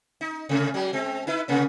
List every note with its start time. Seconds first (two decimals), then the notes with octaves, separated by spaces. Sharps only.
0.21 D#4
0.49 C3 A3 C#4
0.74 F#3 G#3
0.93 G#3 C4
1.27 D#4 E4 B4
1.48 C3 A#3 C#4